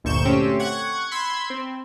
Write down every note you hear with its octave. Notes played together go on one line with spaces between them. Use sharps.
G1 D2 A#2 C#6 G6 E7
A3 C4 C#4 G4
F#5 C#6 G#6
B5 C6 E6 G#6
C4